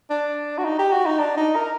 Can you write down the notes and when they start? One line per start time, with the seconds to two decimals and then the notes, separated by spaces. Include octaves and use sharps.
0.10 D4
0.58 F#4
0.64 D#4
0.79 G4
0.92 F#4
1.06 D#4
1.19 D4
1.37 D#4
1.56 A#4